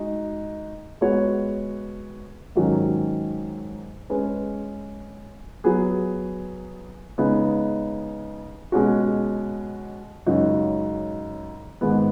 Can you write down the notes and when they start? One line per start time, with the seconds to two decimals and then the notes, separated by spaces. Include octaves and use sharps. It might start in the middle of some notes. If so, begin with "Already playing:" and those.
Already playing: G#3 D#4 F#4
1.01 G#3 B3 F#4 C#5
2.55 G#2 D#3 F#3 C#4
4.10 G#3 C#4 B4
5.64 F#3 B3 G#4
7.18 C#3 G#3 B3 D#4 G#4
8.72 B2 G#3 C#4 F#4
10.26 F#2 C#3 G#3 D#4 F#4
11.81 G#2 D#3 G#3 B3